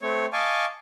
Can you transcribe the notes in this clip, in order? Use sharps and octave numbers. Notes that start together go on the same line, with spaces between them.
A3 C4 C#5
D#5 F5 G#5 A5 C#6 D6